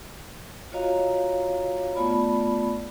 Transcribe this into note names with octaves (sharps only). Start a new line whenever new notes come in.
F4 F#4 C#5 D#5 F5 A#5
A3 B3 F4 D5 B5